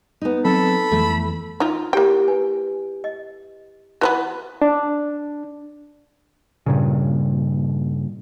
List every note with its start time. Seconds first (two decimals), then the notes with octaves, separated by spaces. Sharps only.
0.21 B3 D#4
0.45 F#3 C4 A4 B5
0.91 F2 E3 A3
1.60 D#4 F4
1.93 A#3 E4 G4 C#5 G5
2.28 B4 G#5
3.04 D#5
4.01 E3 F3 B3 F#4
4.62 D4
6.66 G2 A#2 C#3